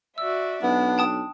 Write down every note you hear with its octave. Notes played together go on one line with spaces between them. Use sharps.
F#4 D5 E5 E6
B1 B3 D4
G5 A5 D#6